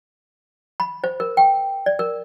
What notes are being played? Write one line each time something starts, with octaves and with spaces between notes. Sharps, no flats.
B5
C5
A#4
G5
D5
A#4